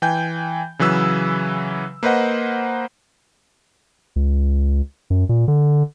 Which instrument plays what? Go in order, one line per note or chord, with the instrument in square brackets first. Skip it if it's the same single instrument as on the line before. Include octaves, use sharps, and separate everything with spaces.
[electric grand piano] E3 G5 G#5 G6
C#3 E3 F#3 B4 E6
A#3 B4 C5 D#5 F#5
[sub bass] C#2
F#2
A#2
D3